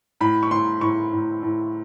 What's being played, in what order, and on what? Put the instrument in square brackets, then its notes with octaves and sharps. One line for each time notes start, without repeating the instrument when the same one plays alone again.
[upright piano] A2 B5
C#6
A2 C6
A2 C#6
A2
A2